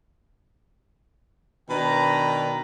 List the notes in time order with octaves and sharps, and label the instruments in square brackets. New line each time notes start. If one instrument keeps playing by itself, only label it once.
[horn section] B2 D#3 D4 B4 G5 A#5